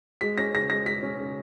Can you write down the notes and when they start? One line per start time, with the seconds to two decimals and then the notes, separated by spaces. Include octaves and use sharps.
0.21 G#3 B6
0.38 C#4 A#6
0.53 C#3 A#6
0.70 G#3 A#6
0.86 G#3 B6
1.02 C#4
1.19 C#3